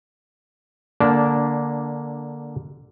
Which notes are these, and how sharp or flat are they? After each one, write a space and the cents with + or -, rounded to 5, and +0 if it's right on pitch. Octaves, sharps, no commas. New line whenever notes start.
D3 +0 A#3 +5 D4 -15